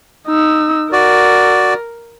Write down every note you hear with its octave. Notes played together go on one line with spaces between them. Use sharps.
D#4 E6
F#4 A#4 D5